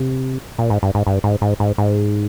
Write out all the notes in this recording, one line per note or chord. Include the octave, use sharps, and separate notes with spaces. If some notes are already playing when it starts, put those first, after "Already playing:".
Already playing: C3
A#2
G#2
G2
G#2
G2
G#2
G#2
G#2
G#2